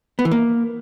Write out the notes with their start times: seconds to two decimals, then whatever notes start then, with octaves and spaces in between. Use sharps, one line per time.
0.19 B3
0.25 E3
0.31 A#3